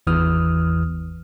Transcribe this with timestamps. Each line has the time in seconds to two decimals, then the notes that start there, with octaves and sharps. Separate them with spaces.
0.07 G#1 E2 E3 D#6 F6